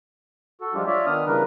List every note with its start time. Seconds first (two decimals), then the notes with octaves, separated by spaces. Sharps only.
0.61 F#4 A4
0.74 F3 G3 G#3 D4 F4 G4
0.87 F4 C#5 D5 E5
1.06 D#3 B3 D4 D#6 F6
1.26 C#3 E3 G3 D4 A#4 B4